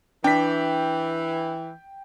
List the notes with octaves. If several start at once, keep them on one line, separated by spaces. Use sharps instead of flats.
E3 D4 G5 B6